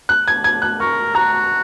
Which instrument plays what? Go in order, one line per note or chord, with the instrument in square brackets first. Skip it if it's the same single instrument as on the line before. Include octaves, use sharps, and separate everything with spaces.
[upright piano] F#6
G#6
G#6
F#6
[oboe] A#4 [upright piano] C#6
[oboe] F#4 [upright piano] A#5